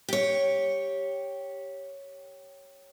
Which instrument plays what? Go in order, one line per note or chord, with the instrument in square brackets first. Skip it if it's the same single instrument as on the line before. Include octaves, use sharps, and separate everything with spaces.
[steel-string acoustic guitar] G4 C#5